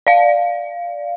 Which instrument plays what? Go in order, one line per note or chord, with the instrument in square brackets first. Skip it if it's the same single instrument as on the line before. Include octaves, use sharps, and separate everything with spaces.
[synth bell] D5 F5